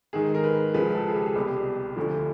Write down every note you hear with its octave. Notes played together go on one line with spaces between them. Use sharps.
G#2 D#3 G#4
A#4
B4
C#2 C#3 F3 B4
A4
G#4
G4
G#4
C2 B2 G4
D2 D3 F3